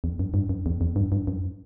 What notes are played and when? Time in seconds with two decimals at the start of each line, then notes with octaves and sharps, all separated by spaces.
0.04 E2
0.19 F#2
0.34 G2
0.49 F#2
0.66 E2
0.81 E2
0.96 G2
1.12 G2
1.27 F#2